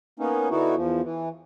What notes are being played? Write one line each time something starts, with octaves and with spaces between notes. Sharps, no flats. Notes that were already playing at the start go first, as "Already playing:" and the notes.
A#3 B3 C#4 D#4
D3 B3 D#4 E4 F#4
E2 F3
E3